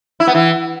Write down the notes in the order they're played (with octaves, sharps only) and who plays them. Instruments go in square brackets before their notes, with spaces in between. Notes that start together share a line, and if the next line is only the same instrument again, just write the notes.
[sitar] E4
B3
E3